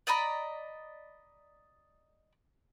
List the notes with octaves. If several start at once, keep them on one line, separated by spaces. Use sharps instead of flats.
D5 D#5 A#5 B5